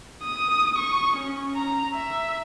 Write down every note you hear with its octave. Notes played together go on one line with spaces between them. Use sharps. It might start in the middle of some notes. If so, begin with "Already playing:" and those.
D#6
C#6
C#4
A#5
E5